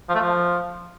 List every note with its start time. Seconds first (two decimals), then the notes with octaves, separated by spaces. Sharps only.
0.09 F3
0.15 A3
0.20 F3